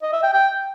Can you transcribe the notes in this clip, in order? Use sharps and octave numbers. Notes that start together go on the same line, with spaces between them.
D#5
E5
G5
G5